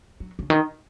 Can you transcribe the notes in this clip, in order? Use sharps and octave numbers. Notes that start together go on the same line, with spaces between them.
F#3
C#3
D#3